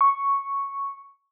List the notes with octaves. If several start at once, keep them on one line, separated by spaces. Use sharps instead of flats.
C#6